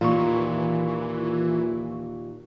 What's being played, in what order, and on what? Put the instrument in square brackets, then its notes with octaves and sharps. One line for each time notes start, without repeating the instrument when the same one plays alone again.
[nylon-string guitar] D#2 A#2 [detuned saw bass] E3 [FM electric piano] F4 C#6